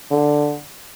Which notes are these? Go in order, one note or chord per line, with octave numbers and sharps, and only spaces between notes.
D3